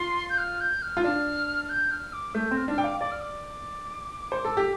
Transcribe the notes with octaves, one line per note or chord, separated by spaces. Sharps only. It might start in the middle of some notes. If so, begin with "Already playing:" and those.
Already playing: F4 C6
G6
F6
G6
F6
F4
D4 F6
F6
G6
F6
D6
A3 G6
C4
F6
D4 F6
G5 D6
F5
D5 D6
F6
D6
C5
A4
G4